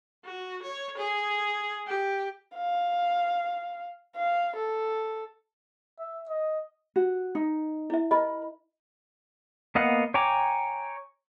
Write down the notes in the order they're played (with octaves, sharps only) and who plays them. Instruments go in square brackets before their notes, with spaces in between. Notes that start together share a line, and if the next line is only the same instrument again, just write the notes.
[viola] F#4
C#5
G#4
G4
[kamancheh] F5
F5
A4
[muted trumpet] E5
D#5
[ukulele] F#4
D#4
[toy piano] E4 E5
[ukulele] A#4 B5 [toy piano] D#5
[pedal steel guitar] A#3 B3 D#5 F5 F#5
C#5 G5 G#5 A#5 D6